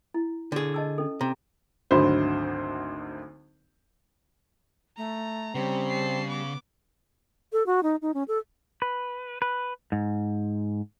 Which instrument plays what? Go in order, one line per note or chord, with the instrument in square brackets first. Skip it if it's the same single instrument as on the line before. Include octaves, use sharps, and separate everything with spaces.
[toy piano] E4
[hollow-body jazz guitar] D3 G#4
[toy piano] D#5 A5 E6
C#4 A4
[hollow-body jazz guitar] C3 [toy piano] A#5
[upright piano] G#1 D2 D3 F#3 C5 B5
[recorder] A3 [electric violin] A#5
[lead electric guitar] C#3 [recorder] G3 [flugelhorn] C4
[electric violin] A5 C7
B3 D6
[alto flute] A4
F#4
D#4
D#4
C#4
A4
[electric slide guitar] B4
B4
G#2